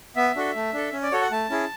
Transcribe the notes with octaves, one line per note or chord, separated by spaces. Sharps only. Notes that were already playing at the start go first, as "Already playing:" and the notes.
B3 E5
D4 F#4 A4
A3
D4 A4
C#4
D5
F#4 A4 C#5
F#5
A3 A5
C#4 E4 G#4